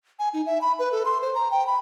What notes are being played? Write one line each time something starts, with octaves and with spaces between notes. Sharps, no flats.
G#5
D#4
E5
B5
B4
A4
C6
C5
A#5
G5
B5